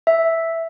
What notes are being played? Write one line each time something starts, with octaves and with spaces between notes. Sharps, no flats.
E5